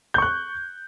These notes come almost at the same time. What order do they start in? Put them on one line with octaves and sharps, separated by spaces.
G6 C#6 F#6